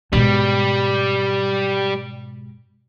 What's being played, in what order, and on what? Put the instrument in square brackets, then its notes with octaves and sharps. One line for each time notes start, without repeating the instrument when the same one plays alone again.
[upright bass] G#2 B2 [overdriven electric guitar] G3